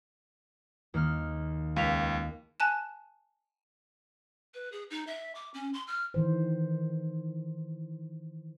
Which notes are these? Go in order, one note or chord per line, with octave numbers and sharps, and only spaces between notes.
D#2 A#3 F6
C#2 F5 B6 F7
G#5 A5 F#6 E7
B4
G#4
D#4
E5
D6
C#4
C6
F6
D#3 E3 C5